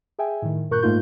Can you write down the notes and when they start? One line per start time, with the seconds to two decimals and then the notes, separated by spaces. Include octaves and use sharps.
0.19 G#4 E5 G5 G#5
0.42 A2 D#3
0.70 G2 A#2 A#4 C#6 F#6 G6
0.82 G#2 A3 A#3 D#4 F4 G6